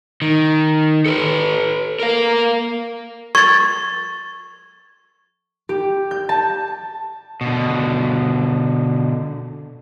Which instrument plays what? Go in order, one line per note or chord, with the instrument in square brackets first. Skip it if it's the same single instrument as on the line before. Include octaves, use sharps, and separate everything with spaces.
[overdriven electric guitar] D#3
A4 B4
A#4 F5
[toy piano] C#6 [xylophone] G#6 A6
[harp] G4
G6
A5
[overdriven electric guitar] B2 D3